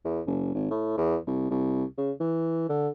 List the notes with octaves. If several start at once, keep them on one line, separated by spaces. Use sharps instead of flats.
E2
F#1
G#1
A2
E2
C2
C2
C#3
E3
D3